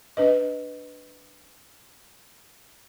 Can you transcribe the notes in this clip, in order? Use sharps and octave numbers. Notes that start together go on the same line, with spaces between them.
D4 B4 D#5